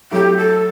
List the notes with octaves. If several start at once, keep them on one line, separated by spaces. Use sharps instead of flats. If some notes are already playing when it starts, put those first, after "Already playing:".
F#3 A3 E4 G4
A4